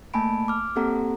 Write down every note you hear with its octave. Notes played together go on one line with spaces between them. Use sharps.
A3 A#3 G#5 A5 B5 D7
D6 F6
A#3 C4 G4 A4 F#5 A#5